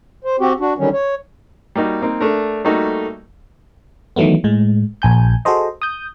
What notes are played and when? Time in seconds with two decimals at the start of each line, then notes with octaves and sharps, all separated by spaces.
0.24 C5
0.40 C4 F#4 G4
0.60 D4 F#4
0.78 D3 D#3 F#3 G3 C#4
0.93 C#5
1.75 G3 A#3 D#4 F#4
2.02 A#3 C4 D#4
2.20 A3 D4 A#4
2.65 G3 A3 A#3 D#4 F#4 A4
4.16 D#3 E3 F#3 A3 B3
4.44 A2 G#3
5.02 A#1 G#5 G6
5.45 F#4 G#4 A4 C5 D#5
5.82 D#6 G6